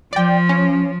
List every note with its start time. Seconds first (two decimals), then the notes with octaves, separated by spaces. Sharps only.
0.13 F3 D5 G5
0.49 C#4